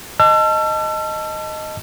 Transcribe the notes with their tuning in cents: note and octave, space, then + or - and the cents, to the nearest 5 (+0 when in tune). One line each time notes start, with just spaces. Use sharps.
D#5 +0 A5 +0 E6 +40